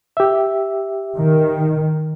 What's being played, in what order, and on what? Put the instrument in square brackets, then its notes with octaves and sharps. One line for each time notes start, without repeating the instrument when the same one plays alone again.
[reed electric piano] G4 E5
[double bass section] D#3